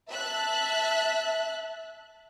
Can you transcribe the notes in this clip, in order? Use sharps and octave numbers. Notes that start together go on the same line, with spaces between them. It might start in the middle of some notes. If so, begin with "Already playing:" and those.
E5 A5 F#6